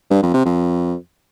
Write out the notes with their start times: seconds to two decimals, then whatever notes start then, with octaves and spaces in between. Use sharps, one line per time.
0.11 G2
0.22 F2
0.34 C3
0.45 F2